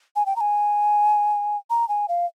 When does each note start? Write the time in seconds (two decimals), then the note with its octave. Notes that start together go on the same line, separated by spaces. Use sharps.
0.16 G#5
0.26 G5
0.36 A#5
0.40 G#5
1.70 A#5
1.89 G#5
2.08 F5